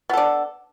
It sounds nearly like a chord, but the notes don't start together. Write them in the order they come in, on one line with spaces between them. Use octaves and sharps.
B3 A4 D4